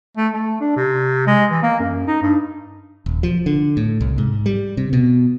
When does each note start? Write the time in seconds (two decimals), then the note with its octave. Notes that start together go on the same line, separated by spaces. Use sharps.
0.17 A3
0.33 A3
0.61 D4
0.76 C3
1.27 G#3
1.51 E3
1.63 A#3
1.80 F#2
2.07 D#4
2.22 G2
3.06 D#1
3.23 F3
3.46 D3
3.77 A2
4.01 C2
4.18 G#2
4.46 G3
4.77 C3
4.93 B2